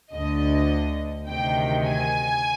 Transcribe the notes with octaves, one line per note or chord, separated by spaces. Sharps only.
D2 D3 D#5
D2 C3 D#3 G5
G#5